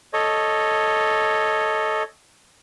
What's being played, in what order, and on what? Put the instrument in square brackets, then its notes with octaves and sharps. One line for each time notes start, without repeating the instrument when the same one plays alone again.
[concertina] A4 C#5 D#5